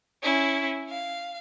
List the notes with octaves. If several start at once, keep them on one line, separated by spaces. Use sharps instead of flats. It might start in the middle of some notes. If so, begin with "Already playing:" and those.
C#4 E4
F5